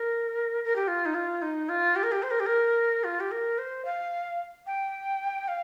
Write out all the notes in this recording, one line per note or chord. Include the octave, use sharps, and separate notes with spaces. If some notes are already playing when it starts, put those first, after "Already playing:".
Already playing: A#4
A#4
G4
F4
D#4
F4
D#4
F4
G4
A#4
G4
C5
A#4
G4
A#4
F4
G4
A#4
C5
F5
G5
F5